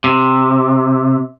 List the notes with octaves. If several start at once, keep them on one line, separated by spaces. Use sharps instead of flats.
C3